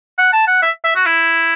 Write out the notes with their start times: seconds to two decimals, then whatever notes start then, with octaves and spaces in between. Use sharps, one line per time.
0.18 F#5
0.33 A5
0.47 F#5
0.62 E5
0.84 E5
0.95 F#4
1.06 E4